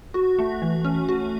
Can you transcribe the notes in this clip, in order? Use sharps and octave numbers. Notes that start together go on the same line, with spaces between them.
F#4
A3
E3
C#4
F#4